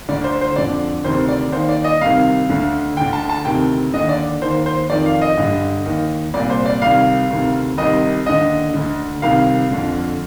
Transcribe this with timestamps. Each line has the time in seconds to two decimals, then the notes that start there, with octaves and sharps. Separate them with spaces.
0.09 D2 D3 D5
0.24 C5
0.41 C5
0.56 F2 D3 D5
1.04 D2 C3 D#3 C5
1.29 D5
1.52 D#2 D#3 C5
1.69 D5
1.84 D#5
2.01 C2 C3 D#3 F5
2.49 D2 D3
2.97 D2 D3 G5
3.13 A5
3.29 A5
3.45 D2 C3 D#3 G5
3.94 D#2 D3 D#5
4.09 D5
4.42 D#2 D#3 C5
4.66 C5
4.89 F2 D#3 D5
5.06 F5
5.22 D#5
5.37 G2 D3
5.86 D#2 D#3
6.34 C2 A#2 D5
6.50 C5
6.66 D5
6.82 C2 C3 D#3 F5
7.30 D2 C3 D#3
7.78 C2 C3 D#3 D#5
8.26 D#2 D3 D#5
8.74 D2 D3
9.22 C2 C3 D#3 F5
9.71 F2 D3